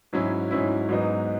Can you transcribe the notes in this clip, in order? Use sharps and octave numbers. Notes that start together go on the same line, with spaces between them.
G#2 F#3 C#4 E4
G#2 F#3 C#4 E4
G#2 F#3 B3 D#4